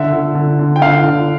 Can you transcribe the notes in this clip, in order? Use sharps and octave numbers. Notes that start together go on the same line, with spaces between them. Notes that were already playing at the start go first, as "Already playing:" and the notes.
Already playing: D3 E5
D3
D3
D3
G5
D3 F5
D3